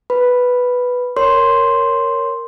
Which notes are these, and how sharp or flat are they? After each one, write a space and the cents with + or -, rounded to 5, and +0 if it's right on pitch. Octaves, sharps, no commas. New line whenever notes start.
B4 +0 B5 +0
A#4 +0 C#5 +0 C6 +0